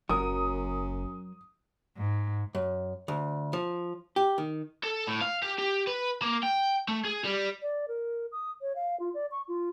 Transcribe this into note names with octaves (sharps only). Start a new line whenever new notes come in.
F#1 F#2 F#3 A#4 D#6
G#2
F#2
D2
F3
G4
D#3
A4
A2
F5
G4
G4
B4
A#3
G5
A3
G#4
G3
D5
A#4
D#6
C#5
F5
F4
D5
C#6
F4